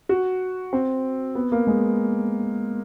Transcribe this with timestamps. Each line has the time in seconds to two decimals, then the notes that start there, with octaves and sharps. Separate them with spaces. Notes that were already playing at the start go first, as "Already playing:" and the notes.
0.09 F#4
0.73 C4
1.35 B3
1.52 A#3
1.67 G#3